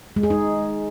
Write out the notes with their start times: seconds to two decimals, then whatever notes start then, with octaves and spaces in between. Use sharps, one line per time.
0.16 G#3
0.23 G#4
0.30 D#4